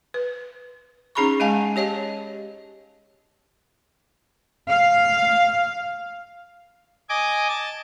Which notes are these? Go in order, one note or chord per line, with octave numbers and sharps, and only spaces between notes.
B4
C#4 D#4 G#4 A#5 B5 C#6
G#3 D#5 F5 G#5 A5
G4 C#5 D#5 A5
F5
D#5 G#5 D6
A5